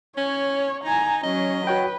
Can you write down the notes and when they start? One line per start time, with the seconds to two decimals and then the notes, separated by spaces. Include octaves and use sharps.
0.18 C#4 C#5
0.84 D#4 G#5 A#5
1.23 F#3 C#4 D#5
1.67 F#4 B4 C#5 G5